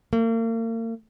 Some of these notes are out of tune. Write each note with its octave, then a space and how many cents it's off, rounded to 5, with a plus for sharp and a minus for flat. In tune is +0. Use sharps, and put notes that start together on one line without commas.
A#3 -40